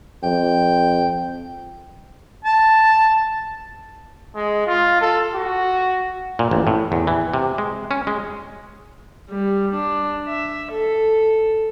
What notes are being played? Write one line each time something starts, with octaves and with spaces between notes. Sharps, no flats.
F2 G5
A5
G#3
F4
A4
F#4
A#2
A1
A2
E2
E3
C3
G#3
C#4
G#3
G3
D4
E5
A4